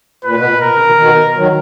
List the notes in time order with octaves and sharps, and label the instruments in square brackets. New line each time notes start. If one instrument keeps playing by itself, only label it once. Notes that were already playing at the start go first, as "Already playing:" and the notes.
[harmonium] A#2 [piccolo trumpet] B4
[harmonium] B2
A#2
[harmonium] B2 [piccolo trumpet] A#4
[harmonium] C#3
B2 D#3
B2 D#3
D#3 F#3